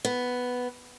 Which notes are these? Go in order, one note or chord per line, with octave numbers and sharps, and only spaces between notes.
B3